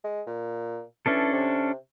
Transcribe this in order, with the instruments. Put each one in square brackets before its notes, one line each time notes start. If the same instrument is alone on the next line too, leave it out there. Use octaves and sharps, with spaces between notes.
[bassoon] G#3
A#2
[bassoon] E3 [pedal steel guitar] C#4 D4 A4
[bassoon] C3